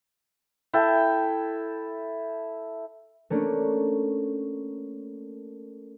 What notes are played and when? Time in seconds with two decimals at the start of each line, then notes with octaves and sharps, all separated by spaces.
0.74 E4 A4 G5
3.30 A3 A#3 C#4 D4